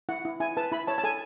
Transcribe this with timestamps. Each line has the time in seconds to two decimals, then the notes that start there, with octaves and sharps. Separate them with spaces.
0.09 E4 F#5
0.25 E4
0.40 E4 G#5
0.57 B4 A5
0.72 E4 B5
0.87 C#5 A5
0.98 A5
1.04 A4 G#5